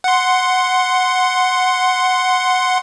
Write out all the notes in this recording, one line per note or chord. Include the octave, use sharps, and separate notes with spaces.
F#5 C6